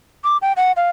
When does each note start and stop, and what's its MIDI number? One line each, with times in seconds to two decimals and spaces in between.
0.24 0.37 86
0.42 0.53 79
0.57 0.72 78
0.76 0.90 77